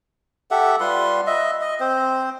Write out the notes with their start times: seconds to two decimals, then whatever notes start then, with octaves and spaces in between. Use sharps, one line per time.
0.51 G4 A4 E5 F#5
0.80 G3 F4 B4 C6
1.27 D#5 E5
1.61 D#5
1.80 C4 C5